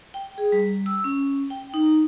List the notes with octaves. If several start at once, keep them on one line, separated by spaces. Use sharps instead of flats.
G5
G#4
G3
E6
C#4
G5
D#4